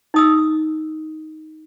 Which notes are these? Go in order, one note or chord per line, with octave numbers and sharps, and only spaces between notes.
D#4 D#6 E6